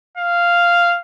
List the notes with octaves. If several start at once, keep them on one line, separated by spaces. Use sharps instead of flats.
F5